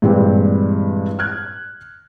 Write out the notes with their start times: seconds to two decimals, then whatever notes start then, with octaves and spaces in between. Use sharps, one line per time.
0.02 G2 A#2 E3 G3 G#3 C4
1.19 F6 F#6 G#6